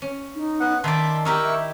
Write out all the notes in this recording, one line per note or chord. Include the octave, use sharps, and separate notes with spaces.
C#4
D#4
B3 F#5
D#3 D5 E5 A5 B5 C6
D#4 E4 G4 A#4 C#6 E6
E5